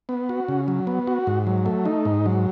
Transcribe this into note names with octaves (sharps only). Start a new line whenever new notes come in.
B3
F#4
C#3
F#3
B3
F#4
G#2
F#3
A3
D#4
G#2
F#3